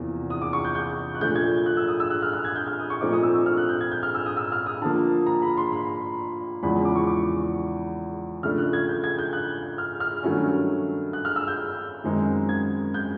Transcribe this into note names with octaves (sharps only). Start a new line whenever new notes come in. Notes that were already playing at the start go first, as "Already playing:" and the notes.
Already playing: E2 C3 F3 A#3
D#6
D6
C#6
G6
G6
F#6
A#2 F3 A3 D4 G6
G#6
F#6
E6
D#6
E6
F#6
F6
F#6
G#6
G6
F6
D#6
C#6
A#2 F3 A3 C4 D#4 D6
D#6
E6
E6
F6
F#6
G6
G#6
G6
F6
E6
D#6
E6
F6
D#6
D3 F3 A#3 A5
A#5
B5
C6
B5
E2 C#3 F3 G#3 C#4 B5
D6
C#6
D6
C#3 F3 A3 D4 F6
F#6
G#6
G6
G#6
G6
F#6
F6
F6
G2 D#3 F#3 A3 C#4
F#6
F6
E6
G6
F#2 D#3 G#3 C4 D#4
G#6
G6